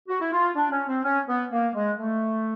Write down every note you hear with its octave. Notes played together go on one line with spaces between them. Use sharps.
F#4
E4
F4
D4
C#4
C4
C#4
B3
A#3
G#3
A3